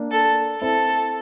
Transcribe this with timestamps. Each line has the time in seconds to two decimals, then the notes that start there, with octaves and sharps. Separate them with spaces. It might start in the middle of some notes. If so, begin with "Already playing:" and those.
Already playing: A#3 D4
0.12 A4
0.61 C4 E4 A4